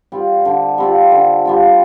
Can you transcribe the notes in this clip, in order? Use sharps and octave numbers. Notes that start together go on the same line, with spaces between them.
G3 C4 F4
D3
G3 C4 F4
D3
G3 C4 F4